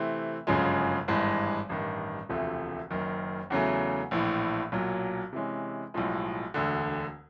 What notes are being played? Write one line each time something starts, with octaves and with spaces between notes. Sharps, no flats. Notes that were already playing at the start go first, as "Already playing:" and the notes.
Already playing: C3 E3 A3 C4
G1 F#2 C#3 F3 G#3
G#1 G2 E3 G#3
A1 G2 D#3
E1 D2 C3 F3 A3
F#1 F#2 D#3
E2 C#3 F#3 A3
A#1 A2 E3
B1 A#2 F#3
C3 E3 G#3 C#4
B1 A2 F3 G#3
E1 D2 D3